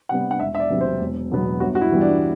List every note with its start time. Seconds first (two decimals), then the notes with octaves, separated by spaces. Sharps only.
0.09 C3 G3 B3 F#5
0.31 F#5
0.40 E1 E5
0.55 E5
0.60 D5
0.70 E2 C3 F#3 B3
0.81 C5
1.01 E1
1.31 E2 B2 F#3 B3
1.60 G1 F#4
1.75 F#4
1.81 E4
1.91 G2 E3 G3 B3
2.01 D4